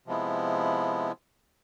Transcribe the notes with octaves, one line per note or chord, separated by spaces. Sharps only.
C3 F3 G#3 B3 E4